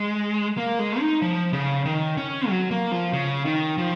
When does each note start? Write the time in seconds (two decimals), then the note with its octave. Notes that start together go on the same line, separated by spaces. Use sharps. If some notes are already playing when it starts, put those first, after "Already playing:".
Already playing: G#3
0.57 A#3
0.79 G#3
1.00 D#4
1.22 F3
1.53 C#3
1.86 D#3
2.17 C#4
2.49 F#3
2.71 A#3
2.92 F3
3.13 C#3
3.45 D#3
3.78 F3